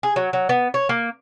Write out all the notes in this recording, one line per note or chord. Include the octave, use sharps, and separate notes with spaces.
G#4
F#3
F#3
B3
C#5
A#3